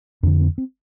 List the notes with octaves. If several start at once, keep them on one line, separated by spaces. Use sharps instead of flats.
F2 D3 D4
C4
C4